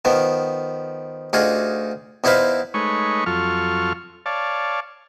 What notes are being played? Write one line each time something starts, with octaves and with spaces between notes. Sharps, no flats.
D#3 F3 B3
D2 D#4 F4 F#4 G#4
E2 D#4 E4 C5 F5 B5
G#3 A3 D#4 B4 C#5 C#6
F2 F#3 F4 A4 C#6 F6
C#5 D5 F5 A5